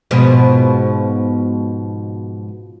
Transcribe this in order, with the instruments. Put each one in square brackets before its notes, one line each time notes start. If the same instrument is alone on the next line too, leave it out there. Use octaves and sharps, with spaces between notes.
[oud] G#2 B2 F3